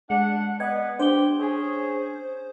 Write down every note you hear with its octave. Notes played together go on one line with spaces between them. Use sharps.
G#3 D4 F#5
B3 D5 D#5 F#5 G#6
D4 G4 C5 G7
C#4 G#4